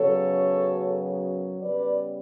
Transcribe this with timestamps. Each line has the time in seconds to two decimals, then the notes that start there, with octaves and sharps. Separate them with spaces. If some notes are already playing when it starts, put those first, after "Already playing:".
Already playing: F#2 C#3 F#3 B3 A4 C#5
1.59 C#3 G3 B3 B4 D5